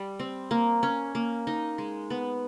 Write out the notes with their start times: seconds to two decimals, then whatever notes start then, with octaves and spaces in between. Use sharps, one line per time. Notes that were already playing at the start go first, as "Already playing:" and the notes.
Already playing: G3
0.20 C4
0.51 A#3
0.83 C#4
1.15 A#3
1.47 D#4
1.78 G#3
2.10 B3